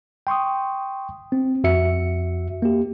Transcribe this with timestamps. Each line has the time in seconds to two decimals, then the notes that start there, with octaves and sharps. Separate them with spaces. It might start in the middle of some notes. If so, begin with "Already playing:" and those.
0.27 G5 C6 C#6 D#6
1.32 C4
1.64 F2 F#4 E5 C#7
2.62 A#3 G4